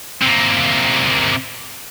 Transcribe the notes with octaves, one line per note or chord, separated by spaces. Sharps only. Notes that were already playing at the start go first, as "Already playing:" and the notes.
C3 A#3